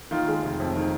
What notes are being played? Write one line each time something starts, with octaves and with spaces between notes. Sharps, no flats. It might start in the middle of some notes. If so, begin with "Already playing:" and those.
D#3 F4
G#3
F1
F2
D#3